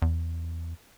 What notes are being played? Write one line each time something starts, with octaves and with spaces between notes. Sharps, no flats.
E2